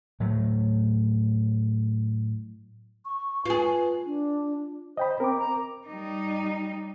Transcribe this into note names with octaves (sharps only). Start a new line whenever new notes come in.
A2 F#3 A3
C#6
F4 G#4 B4
D4
C5 D#5 G5 B5
C4 A#4 D6
A#5
G3 D#4